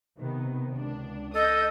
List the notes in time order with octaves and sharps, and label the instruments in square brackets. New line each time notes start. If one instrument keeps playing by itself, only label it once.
[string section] C3 D#3 B3
C#2 D4
[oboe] A4 [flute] D#5 [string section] D#6 G6